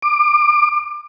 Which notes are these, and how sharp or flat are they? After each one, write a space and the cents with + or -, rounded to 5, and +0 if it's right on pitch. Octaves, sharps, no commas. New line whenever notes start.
D6 +25